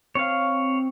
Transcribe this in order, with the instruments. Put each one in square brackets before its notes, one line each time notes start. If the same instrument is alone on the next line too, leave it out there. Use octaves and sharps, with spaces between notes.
[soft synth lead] C4 [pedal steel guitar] C#5 F5